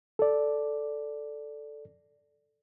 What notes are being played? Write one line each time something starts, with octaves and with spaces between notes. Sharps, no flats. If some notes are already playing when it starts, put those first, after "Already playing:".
A4 D5